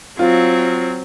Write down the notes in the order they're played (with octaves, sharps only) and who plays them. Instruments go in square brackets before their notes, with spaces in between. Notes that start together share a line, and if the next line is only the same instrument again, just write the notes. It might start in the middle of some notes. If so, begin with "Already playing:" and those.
[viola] F#3 C4 [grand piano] F4